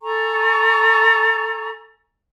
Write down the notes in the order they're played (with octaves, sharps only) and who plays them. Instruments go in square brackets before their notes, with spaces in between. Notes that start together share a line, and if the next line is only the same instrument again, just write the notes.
[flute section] A4 G#5 A#5 C#6